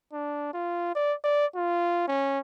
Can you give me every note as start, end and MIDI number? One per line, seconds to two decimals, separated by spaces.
0.13 0.52 62
0.54 0.93 65
0.95 1.14 74
1.25 1.46 74
1.56 2.08 65
2.08 2.39 61